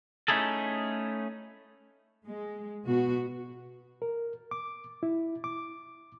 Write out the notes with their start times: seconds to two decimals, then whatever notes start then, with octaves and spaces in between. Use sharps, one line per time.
0.28 A3 C#4 D#4 E4 G#4 A4
2.25 G#3
2.86 B2 F#4
4.02 A#4
4.51 D6
5.03 E4
5.44 D6